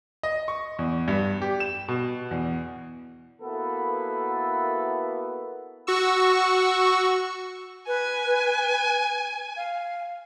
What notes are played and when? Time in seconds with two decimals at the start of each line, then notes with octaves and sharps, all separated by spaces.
0.23 D#5
0.48 C#6
0.79 E2
1.08 G2
1.42 G4
1.60 E7
1.88 B2
2.31 E2
3.41 A#3 B3 E4 F#4 A4 B4
5.87 F#4 C#6 E6
7.87 B4 G#5
9.57 F5